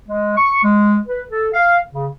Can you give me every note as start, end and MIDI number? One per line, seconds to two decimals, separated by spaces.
0.08 0.37 56
0.37 0.62 85
0.63 0.97 56
1.07 1.23 71
1.30 1.49 69
1.54 1.78 77
1.93 2.08 49